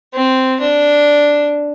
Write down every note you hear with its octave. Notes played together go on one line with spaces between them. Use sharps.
C4
D4